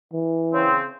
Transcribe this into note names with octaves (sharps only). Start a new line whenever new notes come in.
E3
C#3 C4